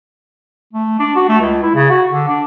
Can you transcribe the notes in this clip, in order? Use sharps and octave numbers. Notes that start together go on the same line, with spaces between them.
A3
D4
F#4
A3
C#2
E4
C#3
F#4
D3
D4